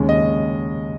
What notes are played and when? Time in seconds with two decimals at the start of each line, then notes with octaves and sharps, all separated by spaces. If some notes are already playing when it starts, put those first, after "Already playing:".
Already playing: D#2 C#3 G#3 C#4
0.09 D#5